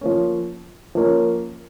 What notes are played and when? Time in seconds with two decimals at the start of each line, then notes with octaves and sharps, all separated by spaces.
0.01 F3 A#3 C#4
0.95 F3 A#3 C#4